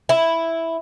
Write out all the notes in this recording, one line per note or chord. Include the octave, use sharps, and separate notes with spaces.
E4